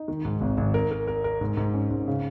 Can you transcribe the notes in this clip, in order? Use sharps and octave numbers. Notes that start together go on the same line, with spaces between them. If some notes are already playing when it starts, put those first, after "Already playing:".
Already playing: D#4
D#3
G#2
G#1
G#1
A#4
A#4
A#4
A#4
G#2
G#2
C#4
G#2
C#3